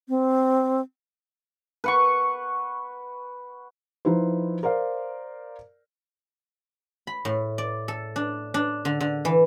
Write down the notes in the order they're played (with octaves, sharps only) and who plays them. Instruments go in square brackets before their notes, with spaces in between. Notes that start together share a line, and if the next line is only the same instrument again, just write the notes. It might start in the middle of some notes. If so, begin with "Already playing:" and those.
[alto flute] C4
[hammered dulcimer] B4 F#5 C#6
[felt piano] F3 D#4 E4 B4 C5
A#4 C5 D5 F5
[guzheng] B5
A2
D5
A4
D4
D4
D3
D3
E3